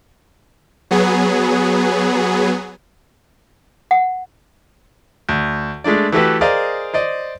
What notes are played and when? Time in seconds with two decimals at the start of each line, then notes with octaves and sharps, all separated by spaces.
0.91 F#3 B3 G#4
3.91 F#5
5.29 D2
5.84 G#3 A3 D4 D5
6.12 E3 A3 F#4 G4 A4 B4
6.41 G#4 A#4 C5 D5 D#5 F5
6.94 C5 D5 D#5